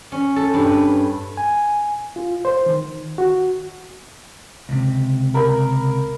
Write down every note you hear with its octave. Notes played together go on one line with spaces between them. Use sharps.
C#4
A4
G2
B4
G#5
F4
C5
D#3
F#4
C#2 C3
A#4 B5